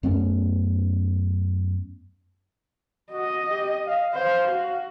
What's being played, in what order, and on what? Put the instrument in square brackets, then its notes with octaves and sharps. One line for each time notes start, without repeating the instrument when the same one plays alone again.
[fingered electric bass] F#2 A3 B3 C#4
[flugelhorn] F#4 [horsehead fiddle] D#5
[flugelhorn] G4
F5
[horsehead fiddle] C5 [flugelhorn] F5
[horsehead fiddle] F#4